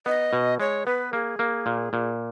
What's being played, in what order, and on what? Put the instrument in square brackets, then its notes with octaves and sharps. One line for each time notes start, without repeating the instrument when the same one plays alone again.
[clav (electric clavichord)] B3 [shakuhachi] D#5
[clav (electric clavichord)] B2
[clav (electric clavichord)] G#3 [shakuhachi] C#5
[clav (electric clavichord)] B3 [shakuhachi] B4
[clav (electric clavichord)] A#3 [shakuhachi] G#4
[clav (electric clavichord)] A#3
A#2
A#2